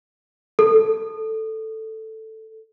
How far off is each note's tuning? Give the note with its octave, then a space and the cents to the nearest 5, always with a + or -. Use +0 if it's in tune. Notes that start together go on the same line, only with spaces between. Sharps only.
A4 +5